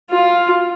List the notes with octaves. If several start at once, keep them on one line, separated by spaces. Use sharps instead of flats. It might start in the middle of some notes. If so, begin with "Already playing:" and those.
F4